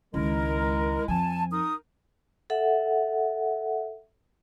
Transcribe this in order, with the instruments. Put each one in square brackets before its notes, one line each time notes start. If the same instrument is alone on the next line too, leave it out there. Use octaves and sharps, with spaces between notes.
[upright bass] C#2 D#3 [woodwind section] G#3 E4 A#4
[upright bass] F2 F3 [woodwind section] G#5 A5
[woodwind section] D#4 A#4 D#6
[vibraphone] A4 E5 F#5